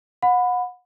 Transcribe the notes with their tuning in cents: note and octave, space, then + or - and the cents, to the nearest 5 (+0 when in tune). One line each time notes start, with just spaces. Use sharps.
F#5 -30 B5 +15